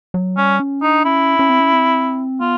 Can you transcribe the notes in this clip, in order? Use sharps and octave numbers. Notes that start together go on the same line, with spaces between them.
F#3
G3 C#4
C#4
D4 D#4
C#4 E4
C#4
C4
C#4
C4
B3 F4